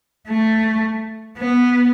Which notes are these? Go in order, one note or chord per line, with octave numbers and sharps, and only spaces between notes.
A3
B3